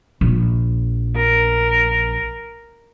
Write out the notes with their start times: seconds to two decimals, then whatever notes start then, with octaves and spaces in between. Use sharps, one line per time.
0.21 A#1
1.16 A#4